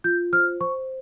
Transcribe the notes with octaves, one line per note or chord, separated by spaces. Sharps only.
F4 G6
C5 F6
C5 C#6